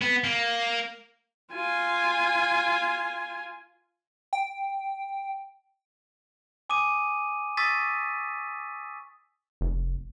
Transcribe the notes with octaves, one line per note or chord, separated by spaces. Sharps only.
B3
A#3
F4 G#5
G5
G#5 D6 D#6 D#7
C#6 D#6 E6 A6 B6 D#7
F1